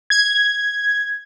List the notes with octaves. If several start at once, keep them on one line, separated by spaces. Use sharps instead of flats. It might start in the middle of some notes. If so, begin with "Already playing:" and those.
G#6